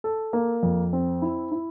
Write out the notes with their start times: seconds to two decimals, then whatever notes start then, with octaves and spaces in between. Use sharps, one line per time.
0.04 A4
0.33 A#3
0.63 F2
0.93 C4
1.22 E4
1.52 E4